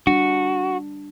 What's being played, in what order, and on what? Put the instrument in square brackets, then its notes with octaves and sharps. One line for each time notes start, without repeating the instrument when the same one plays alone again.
[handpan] G3 D4 [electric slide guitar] F#4